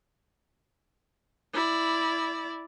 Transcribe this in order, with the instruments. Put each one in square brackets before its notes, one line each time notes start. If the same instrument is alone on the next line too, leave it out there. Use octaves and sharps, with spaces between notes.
[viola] E4 D5